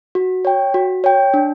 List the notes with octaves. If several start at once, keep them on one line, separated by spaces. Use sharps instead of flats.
F#4
C#5 G5
F#4
C#5 G5
D4